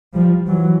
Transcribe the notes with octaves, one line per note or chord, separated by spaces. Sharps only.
F3 G3
E3 F#3